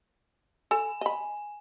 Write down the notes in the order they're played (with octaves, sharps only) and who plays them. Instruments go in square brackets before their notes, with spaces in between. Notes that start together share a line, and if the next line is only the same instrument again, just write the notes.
[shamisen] A4 [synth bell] G#5
[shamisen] D#5 B5